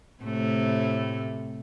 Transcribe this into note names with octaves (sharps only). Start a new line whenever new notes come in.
A2 C3 A3